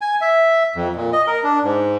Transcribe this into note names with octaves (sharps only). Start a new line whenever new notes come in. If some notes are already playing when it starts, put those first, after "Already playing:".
G#5
E5
F2
A#2
D#5
A#4
D4
G#2